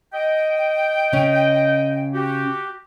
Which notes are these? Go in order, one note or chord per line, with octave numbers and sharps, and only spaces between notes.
D#5 G5
C#3 C#4
F#4 G4